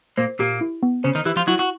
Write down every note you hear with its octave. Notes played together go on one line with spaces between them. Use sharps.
A#2 A#3 C5
A#2 A#3 G4
E4
B3
C#3 C#4 C5
D#3 D#4
E3 E4 G4
F3 F4
F#3 E4 F#4
F#4